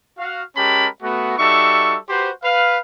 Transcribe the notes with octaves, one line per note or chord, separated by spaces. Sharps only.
F#4 F5
G#3 C#4 G4 A#4 A5 B5
A3 B3 F#4
G3 D#4 F#4 A4 E5 C#6
F#4 G4 B4 C5
B4 F5